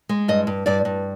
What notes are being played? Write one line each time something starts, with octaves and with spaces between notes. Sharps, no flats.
G#3
G2 D#5
G2
G2 D5
G2